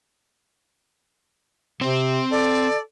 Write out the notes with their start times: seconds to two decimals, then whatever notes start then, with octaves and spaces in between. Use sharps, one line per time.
1.81 C3 C4 C5
2.31 A4 D5